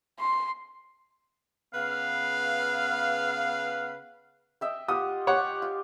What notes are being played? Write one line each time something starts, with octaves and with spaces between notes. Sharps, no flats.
C6
C#3 B3 B4 F5
D#5 E5 G5
F4 G4 F#5 D#6
G4 C#5 F#5
F4